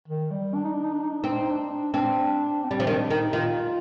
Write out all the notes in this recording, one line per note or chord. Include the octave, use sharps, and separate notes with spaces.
D#3
G3
D4
D#4
D4
D#4
D4
D#4
D4
C4 D#4
D4
D#4
D4
C4 D4
C4
G3
F3
D#3 D4
D#3 D#4
D#3 F4